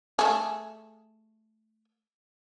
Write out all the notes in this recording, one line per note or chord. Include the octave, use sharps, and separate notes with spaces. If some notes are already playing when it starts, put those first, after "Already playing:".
A3 G#4